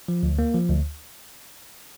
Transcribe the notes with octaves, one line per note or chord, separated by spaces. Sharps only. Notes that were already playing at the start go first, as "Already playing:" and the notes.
F3
D2
A#3
F3
D2